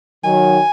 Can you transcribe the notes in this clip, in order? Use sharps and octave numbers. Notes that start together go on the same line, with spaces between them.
D#3 F#3 G#5